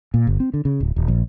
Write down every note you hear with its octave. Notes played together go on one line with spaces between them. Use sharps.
A#2
G1
C4
D3
C#3
D1
D#1
A#1